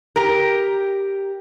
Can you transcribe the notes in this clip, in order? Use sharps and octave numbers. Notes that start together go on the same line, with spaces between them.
G4 A#4